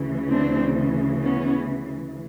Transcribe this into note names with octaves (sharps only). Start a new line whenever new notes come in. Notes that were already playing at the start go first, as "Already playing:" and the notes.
Already playing: D2 C#3 E3
C4 D4
B3 C#4